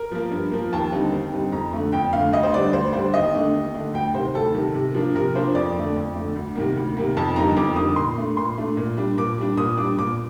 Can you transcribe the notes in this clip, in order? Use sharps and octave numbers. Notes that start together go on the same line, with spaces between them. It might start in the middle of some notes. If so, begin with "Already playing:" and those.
Already playing: A#4
F3 A#3
G2
F3 A#3
D#2 A5
D3 G3 C4 D#4
D#2
D3 G3 C4 D#4
F2 A#5
D3 A3
F2 G5
D3 A3 F5
D2 D#5
C5
D3 G3 D4 D5
D2 C5
D3 G3 D4 C5
D#2 D#5
D3 A3 D4
D#2
D3 A3 D4
D2 G5
C3 D#3 C5
D2 A4
C3 D#3
C3
F3 A#3 D4
C3 A#4
F3 A#3 D4 C5
F2 D5
D3 A3
F2
D3 A3
D2
C3 D#3 A#3
D2
C3 D#3 A#3
F2 A5
D3 G3 A#3 D#4 A#5
F2 D6
D3 G3 A#3 D#4 D#6
A#2 C6
A3 D4
A#2 C6
A3 D4
A#2
G3 D4
A#2 D6
G3 D4
A#2 D#6
G3 D4 D6
A#2 D6